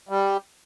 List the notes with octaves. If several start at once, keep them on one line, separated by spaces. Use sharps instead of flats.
G3